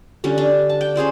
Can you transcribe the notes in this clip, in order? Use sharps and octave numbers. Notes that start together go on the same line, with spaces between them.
D3 G3 C#4
D4
A5
G5
C#4 G#4 C5 D5